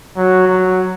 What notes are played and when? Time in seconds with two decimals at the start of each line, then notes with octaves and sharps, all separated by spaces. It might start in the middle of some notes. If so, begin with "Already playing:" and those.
0.17 F#3
0.48 F#3